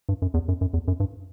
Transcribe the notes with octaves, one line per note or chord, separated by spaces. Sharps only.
G2
F#2
E2
F#2
F#2
E2
F#2
G2